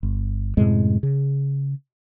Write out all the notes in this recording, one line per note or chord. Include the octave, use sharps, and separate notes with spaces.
G1
F#2 A2 C3 G#3
C#3